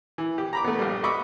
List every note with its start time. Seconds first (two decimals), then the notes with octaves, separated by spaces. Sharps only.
0.18 E3
0.38 G4
0.53 A#5 B5 D6
0.64 A3 B3
0.79 A#1 G3
1.03 D#5 B5 C#6 D6 E6